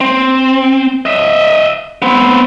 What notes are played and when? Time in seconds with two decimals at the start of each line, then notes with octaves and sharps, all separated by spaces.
0.01 C4
1.06 D#5 E5
2.02 B3 C4